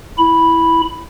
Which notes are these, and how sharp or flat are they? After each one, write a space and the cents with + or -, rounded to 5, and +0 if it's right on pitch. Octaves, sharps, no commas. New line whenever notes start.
E4 +0 B5 -5